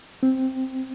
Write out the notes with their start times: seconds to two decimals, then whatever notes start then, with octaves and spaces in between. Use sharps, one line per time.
0.23 C4